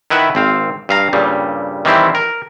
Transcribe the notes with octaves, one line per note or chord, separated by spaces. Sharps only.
D#3 E4 B4 E5 F#5
G#1 C4 F5
G2 F5 A#5
G2 A#2 C#3 G3
D#3 E3 G3 C4 E4
A#4